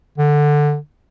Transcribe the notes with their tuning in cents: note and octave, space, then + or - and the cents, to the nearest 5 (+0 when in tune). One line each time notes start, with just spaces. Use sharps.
D3 +5